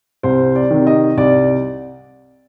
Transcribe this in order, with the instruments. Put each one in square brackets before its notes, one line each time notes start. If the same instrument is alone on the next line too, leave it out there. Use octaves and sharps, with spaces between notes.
[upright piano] C2 C5
D5
C3 D#3
D#5
C2 D5